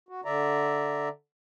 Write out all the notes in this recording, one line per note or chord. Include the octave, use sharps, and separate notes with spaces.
F#4
D3 D5 E5 A#5